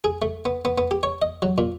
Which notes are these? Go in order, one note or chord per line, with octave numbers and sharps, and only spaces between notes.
G#4
A3
B3
B3
B3
G4
C#5
D#5
F#3
A#2